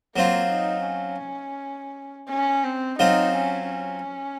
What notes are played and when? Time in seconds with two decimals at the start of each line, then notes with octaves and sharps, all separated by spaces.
0.16 F#3 A#3 C4 F4
0.51 D#4
0.87 C#4
2.29 C#4
2.64 C4
2.99 F#3 C4 D#4 F4
3.36 C#4
3.70 C#4